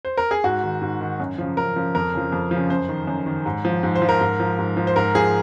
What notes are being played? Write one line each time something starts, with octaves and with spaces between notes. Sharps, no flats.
C5
A#4
G#4
G#2 F#4
D#3
G#2
D#3
F#2
C#3 F3
F#2 A#4
C#3 F3
F2 A#4
C#3 F3
F2
F3
C#3
F#2 C5
D#3
F#2
D#3
G#2
F3
G#2
C5
F3
A#4
G#2
F3
G#2
F3
C5
G#2 A#4
F3 G#4